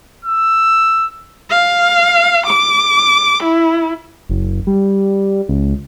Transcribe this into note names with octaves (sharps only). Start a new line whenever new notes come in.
E6
F5
D6
E4
F#1
G3
C#2